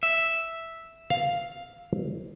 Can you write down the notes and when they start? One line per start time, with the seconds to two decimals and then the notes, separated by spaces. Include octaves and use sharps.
0.03 E5
1.10 F5